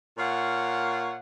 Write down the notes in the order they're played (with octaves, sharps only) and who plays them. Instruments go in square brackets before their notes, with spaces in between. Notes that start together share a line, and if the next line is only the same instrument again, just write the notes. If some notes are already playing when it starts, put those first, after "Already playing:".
[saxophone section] A#2 C#5 F5 F#5